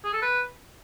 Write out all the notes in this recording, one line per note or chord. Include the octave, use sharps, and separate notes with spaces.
G#4
A4
B4